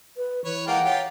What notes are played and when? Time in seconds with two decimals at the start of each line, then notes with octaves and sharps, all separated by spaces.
0.17 B4
0.45 E3 B4 C#5
0.67 G#3 A#3 F4 F#5 G5
0.85 F4 G4 C#5